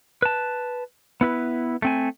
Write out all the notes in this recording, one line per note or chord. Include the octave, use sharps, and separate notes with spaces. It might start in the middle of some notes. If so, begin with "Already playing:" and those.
B4 A5
B3 E4 B4
A3 C4 G#5